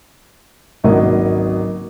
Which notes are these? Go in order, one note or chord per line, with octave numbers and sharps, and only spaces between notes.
G#1 C#2 F#3 A#3 D#5